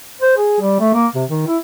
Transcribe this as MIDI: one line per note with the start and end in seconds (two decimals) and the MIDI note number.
0.21 0.35 72
0.37 0.58 68
0.61 0.77 55
0.80 0.90 57
0.94 1.07 58
1.15 1.24 48
1.29 1.43 51
1.47 1.58 64